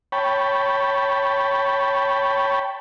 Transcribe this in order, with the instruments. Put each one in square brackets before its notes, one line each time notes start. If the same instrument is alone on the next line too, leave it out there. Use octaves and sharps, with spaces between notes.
[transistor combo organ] C#5 G5 A5 B5